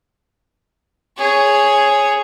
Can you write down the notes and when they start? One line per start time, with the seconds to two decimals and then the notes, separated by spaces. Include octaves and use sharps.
1.18 G#4 C#5